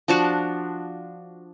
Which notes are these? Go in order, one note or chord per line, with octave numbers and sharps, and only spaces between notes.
F3 D4 F#4